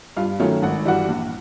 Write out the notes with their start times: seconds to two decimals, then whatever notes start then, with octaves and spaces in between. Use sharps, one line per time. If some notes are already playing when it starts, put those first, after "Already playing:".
0.17 G2 F4 F5
0.40 D#3 F#3 A3 C#4 F4 F5
0.62 G#1 F#5
0.85 G2 E3 G3 F#4 F#5
1.08 A#1